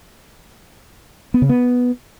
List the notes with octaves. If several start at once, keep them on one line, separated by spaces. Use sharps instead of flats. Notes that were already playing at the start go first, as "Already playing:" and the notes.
B3
C#3
B3